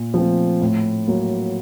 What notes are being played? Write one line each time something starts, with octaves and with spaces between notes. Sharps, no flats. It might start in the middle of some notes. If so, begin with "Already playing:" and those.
Already playing: A#2
F3 A3 C4
A2
F#3 A#3